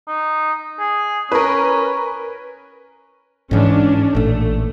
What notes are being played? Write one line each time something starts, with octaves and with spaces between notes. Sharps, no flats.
D#4
G#4
C#4 A#4 B4
G#2 E3 C#4 D4
A1 A#2 A3